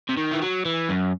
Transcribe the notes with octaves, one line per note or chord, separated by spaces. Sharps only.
C3
D#3
E3
F#3
E3
F#2